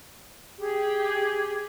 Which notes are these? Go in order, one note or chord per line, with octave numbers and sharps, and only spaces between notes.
G4 G#4